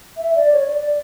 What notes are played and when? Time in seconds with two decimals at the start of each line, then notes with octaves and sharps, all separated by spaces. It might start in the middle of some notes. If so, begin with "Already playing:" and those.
0.17 E5
0.35 D5
0.53 C#5
0.65 D5
0.77 D5